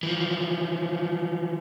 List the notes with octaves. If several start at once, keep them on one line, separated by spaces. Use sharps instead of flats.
E3 F3